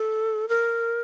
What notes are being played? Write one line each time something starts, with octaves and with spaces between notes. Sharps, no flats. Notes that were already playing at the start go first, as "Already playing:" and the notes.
Already playing: A4
A#4